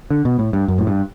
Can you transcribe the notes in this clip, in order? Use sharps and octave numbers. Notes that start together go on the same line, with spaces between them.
D3
B2
A2
G2
F#2
A2
G2